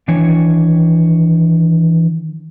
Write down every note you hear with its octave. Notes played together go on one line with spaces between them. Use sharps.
D#3 E3 D4 C#5 G#5